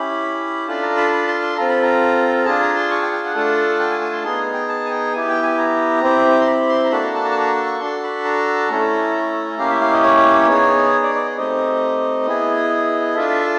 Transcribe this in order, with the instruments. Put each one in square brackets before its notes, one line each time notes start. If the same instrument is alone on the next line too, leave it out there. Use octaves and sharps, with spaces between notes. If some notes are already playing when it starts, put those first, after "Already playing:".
Already playing: [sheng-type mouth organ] C#4 E4 G4 B5
D4 F4 A4 B5
A#5
B5
B5
C6
C6
C4 F4 A4 A#5
B5
A#5
D4 F4 G#4 A5
A#5
C6
C#6
G5
G5
F#5
A3 D4 F4 A4
G5
G#5
G#5
C6
B3 D#4 G#4 C6
G5
A5
G#5
G5
B3 E4 G4 G#5
G5
G#5
A#5
C4 E4 G4
C6
B5
C6
A#5
A#3 D4 F#4 A4 B5
A#5
A5
A#5
A5
A#5
C#6
D4 F#4 A4 C6
B5
A#5
A3 C#4 E4 A4
A#3 C#4 E4 G4 F5
E5
F5
D#5
C#5
B3 D#4 G#4
D5
D5
D#5
A3 C4 D#4 G4 D#5
B3 E4 G#4
D4 F4 A4 E5
E5